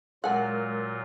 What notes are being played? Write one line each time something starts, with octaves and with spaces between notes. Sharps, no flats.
A#2 F#3 G#3 F4 A#4 F#5 G#5